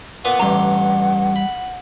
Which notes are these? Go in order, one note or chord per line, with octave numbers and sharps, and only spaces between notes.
A#2 B3 B4 F#5
A1 G2 G3 G4 A#5
B5